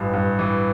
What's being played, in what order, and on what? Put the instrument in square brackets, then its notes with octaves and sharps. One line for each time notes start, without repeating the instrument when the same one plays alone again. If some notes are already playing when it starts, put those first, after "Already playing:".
Already playing: [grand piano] A1 G2
G2
E3